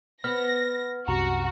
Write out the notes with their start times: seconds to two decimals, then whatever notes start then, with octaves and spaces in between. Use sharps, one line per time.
0.24 B3 B4 F6 A#6
1.08 C2 F#2 C3 F#4 A#5